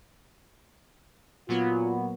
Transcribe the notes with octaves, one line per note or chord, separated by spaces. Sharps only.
A#2 F#3 B3 F4